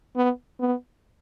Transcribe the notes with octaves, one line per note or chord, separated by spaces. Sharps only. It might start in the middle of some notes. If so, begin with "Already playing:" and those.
B3
B3